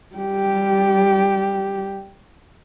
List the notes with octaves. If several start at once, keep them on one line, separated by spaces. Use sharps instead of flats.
G3 G4